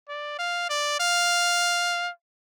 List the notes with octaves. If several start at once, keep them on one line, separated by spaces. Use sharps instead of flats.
D5
F5
D5
F5